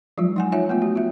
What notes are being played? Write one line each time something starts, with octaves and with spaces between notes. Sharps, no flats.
F3 F#3 G#3 F4
D#4 F#5 G#5
F4 C#5 E5 G#5
A3 B3 F4
F#4
F4 E5